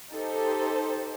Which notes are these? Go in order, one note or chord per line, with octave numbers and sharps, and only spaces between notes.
D#4 G4 A4 C5